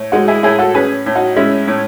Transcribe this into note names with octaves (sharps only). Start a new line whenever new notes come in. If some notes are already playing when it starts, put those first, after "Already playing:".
Already playing: A2
G#3 D#4 F#4
E4 G#4
A2 E4 G#4
F#4 A4
C#4 G#4 B4
A2
D#4 F#4
G#3 C#4 E4
A2